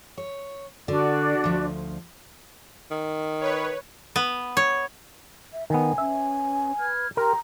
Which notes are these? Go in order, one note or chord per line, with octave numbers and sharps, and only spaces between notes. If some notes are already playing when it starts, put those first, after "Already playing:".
C#5
D3 D4 F#4 D5
D2 F3
D#3
B4 C#5
B3
C#5
E5
D#3 B3 G#5
C#4 B4 E5
B4 F6 G#6
G4 A#4 G5 A#5 C6